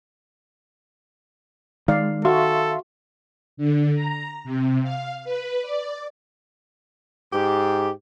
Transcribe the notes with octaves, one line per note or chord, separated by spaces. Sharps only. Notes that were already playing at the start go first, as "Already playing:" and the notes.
D#3 G#3 D5 F5
F#4 A4 E5 F5 C6
D3
A#5
C3
F5
B4
D5
G#2 G4